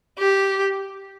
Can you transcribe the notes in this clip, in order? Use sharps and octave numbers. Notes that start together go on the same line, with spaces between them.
G4